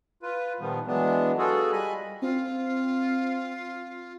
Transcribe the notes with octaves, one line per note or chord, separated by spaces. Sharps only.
F4 B4
A#2 D#3 F3 G3 B3
E3 F#3 G#3 B3 D4
B3 F4 F#4 G#4 A4
G3 D#5 G#5 B5
C4 F4